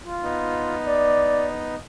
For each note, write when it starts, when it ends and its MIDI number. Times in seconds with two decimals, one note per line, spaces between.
0.01 0.75 65
0.23 1.75 59
0.23 1.75 63
0.85 1.46 74